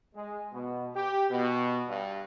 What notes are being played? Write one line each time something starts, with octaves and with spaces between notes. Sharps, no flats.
G#3
B2
G4
B2
G2